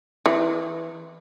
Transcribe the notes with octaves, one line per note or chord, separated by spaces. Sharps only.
E3